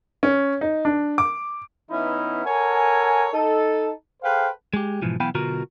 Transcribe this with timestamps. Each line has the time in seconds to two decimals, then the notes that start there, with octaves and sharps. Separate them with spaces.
0.23 C#4
0.61 D#4
0.85 D4
1.18 D6
1.90 E3 B3 C#4 D#4 E4
2.45 A4 A#4 C#5 F#5 G#5
3.33 D#4 A4
4.22 G#4 A4 B4 C5 F5 G5
4.74 G#3 G4
5.02 G#2 B2 E3 F3
5.20 B1 E3 B3 F5 G5 B5
5.35 B1 B2 D3 F4 F#4 A#4